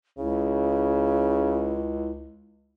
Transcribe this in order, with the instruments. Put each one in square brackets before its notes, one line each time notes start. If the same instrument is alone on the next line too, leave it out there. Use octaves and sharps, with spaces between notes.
[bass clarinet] C#2 [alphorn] C#3 [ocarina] E4